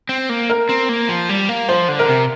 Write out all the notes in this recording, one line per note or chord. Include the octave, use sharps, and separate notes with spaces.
C4
A#3
A#4
C4
A#3
F3
G3
A#3
F3 C5
D3
A#4
C3